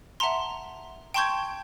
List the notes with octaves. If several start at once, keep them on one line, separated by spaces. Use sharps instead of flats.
E5 F#5 A5 A#5 C6
G5 A5 C6 C#6 G6 G#6